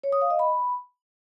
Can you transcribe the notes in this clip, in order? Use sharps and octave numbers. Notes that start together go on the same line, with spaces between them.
C#5
D#6
F5
D#5
B5